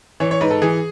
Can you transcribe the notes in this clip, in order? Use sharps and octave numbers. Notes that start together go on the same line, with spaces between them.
E3 C#5
C#5
G#2 B4
A4
E3 G#4